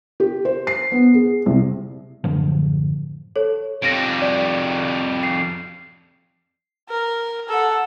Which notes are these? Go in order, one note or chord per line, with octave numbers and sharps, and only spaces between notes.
G4
C5
C7
B3
G#4
C2
F#2 A2 D3 F3
A4 C#5
F2 G3 A#6 D7
D5
C7
A#4
A4 F#5